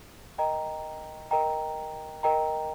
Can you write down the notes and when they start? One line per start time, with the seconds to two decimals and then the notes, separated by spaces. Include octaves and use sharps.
0.38 A#4 D#5 G5 A#5
1.31 A#4 D#5 G5 A#5
2.23 A#4 D#5 G5 A#5